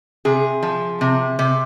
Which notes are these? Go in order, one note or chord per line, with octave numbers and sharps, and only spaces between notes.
C3 G#4
F3
C3
C3